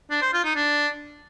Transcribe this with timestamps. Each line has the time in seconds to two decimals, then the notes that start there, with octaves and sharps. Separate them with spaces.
0.11 D4
0.22 C5
0.33 F4
0.44 D#4
0.56 D4